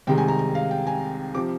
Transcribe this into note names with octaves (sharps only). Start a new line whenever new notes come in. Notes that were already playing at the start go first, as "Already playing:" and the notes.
C2 C3 D#3 G#3 G5
G#5
A#5
A#5
F5
G5
G#5
C3 F3 D6